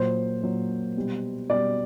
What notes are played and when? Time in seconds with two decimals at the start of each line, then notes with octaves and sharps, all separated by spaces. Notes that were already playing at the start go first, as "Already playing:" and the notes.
Already playing: A#2 F#3 C5
0.42 A#2 F#3
0.96 B2 G3
1.49 B2 G3 D5